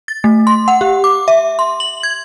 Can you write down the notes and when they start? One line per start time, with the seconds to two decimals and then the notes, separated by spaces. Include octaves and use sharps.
0.08 A6
0.24 A3
0.47 C6
0.68 F#5
0.81 G4
1.04 D6
1.28 E5
1.59 C6
1.80 F#7
2.03 G#6